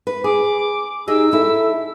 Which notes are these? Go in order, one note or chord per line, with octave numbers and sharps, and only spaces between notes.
B4
G#4 D6
D#4 G4 G#4 D#5 E6
E4 A4